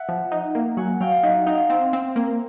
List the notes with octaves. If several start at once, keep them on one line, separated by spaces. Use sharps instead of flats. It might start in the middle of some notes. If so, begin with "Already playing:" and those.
Already playing: E5 F#5
F3
D#4
A#3
F#3 F#5 G#5
F#3 F5 G5
D#4 E5 F#5
D#4 F5 G5
C4
C4
A#3